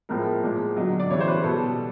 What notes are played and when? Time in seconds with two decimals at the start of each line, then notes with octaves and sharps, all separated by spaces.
0.09 A2 F3 G#3 A#4
0.43 A#2 F3 G#3
0.77 D3 F#3 D#5
1.00 D5
1.10 C#3 E3 G3 C#5
1.20 C5
1.28 B4
1.44 B2 G3 A4